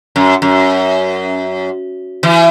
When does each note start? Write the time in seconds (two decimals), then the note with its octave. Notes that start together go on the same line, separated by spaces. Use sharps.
0.16 F#2
0.42 F#2
2.23 E3